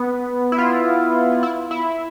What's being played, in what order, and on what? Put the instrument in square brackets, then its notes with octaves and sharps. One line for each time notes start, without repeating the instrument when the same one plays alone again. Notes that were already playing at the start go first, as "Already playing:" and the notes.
Already playing: [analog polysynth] B3
E4
F4
E4
E4